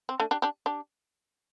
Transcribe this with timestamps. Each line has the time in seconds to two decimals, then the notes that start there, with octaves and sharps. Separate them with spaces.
0.09 C4
0.20 A3 D4
0.31 D4 G4
0.42 D4 G4
0.66 D4 G4